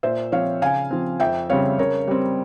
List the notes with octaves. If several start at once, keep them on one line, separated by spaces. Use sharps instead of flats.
A#2 C5 E5
F3 C4 C#5 F5
C#3 F5 G#5
F3 C4
F2 E5 G5
C#3 G3 C4 C#5 F5
C#3 A#4 C#5
G3 C4